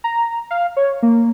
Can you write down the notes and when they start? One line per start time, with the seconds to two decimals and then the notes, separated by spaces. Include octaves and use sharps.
0.04 A#5
0.51 F5
0.77 C#5
1.02 A#3